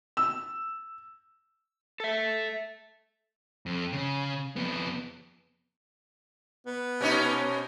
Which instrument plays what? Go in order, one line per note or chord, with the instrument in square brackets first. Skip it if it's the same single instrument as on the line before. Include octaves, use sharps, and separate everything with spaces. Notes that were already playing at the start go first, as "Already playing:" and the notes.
[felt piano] E6
[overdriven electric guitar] A4 E5
[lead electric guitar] F2
C#3
F2 B3
[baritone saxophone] B3
[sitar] B2 C#4 D#4